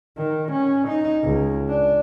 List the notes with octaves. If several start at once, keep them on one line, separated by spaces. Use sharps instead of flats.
D#3
C#4
D#4
C#2
D4